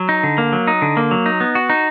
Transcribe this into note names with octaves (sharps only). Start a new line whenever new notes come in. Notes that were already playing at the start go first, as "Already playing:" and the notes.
Already playing: F#3
D#4
D3
A#3
F#3
D#4
D3
A#3
F#3
D#4
B3
F#4
D#4